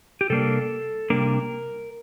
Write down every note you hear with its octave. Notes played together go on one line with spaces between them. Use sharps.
G4
C3 G3 A#3 D4 A4
C3 G3 A#3 D4 A#4